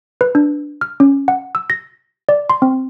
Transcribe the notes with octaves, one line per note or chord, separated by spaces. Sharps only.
B4
D4
F6
C#4
F#5
E6
A#6
D5
C6
C4